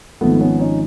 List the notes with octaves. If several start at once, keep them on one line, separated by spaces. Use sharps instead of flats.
G#1 G#2 F3 A3 B3
B3 C#4
C#4 D#4